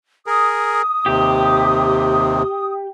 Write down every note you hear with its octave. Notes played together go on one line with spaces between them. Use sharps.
G#4 A#4 D#6
D#2 C3 G4